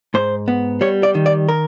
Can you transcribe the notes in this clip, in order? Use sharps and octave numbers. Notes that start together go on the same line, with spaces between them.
G#2 C5
B3
G3 C#5
D5
D#3
D5
A#4